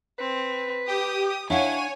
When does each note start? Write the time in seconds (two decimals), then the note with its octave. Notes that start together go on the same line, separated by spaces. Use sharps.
0.19 C4 B4
0.87 G4 D#6
1.50 D4 E4 C#5 F5 F#5 G#5 D#7